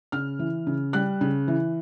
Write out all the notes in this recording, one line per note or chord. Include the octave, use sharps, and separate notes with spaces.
C#3 F6
E3
C#3
G3 F#6
C#3
E3